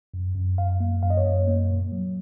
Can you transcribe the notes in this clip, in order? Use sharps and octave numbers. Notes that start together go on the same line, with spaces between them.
F#2
F#2
F#2 F5
A#3
F#2 F5
D#5
C#5
F#2
A#3
A#2
F#3